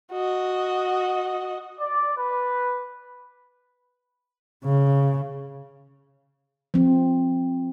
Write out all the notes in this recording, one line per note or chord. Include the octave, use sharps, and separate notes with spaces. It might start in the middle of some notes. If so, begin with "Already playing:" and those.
F#4 D#5
D5
B4
C#3
F3 C4